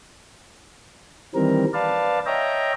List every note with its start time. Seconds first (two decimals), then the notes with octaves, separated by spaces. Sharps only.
1.35 D#3 E3 G3 C4 A#4
1.74 B4 D5 F5 A5
2.26 C#5 D#5 E5 G5 A#5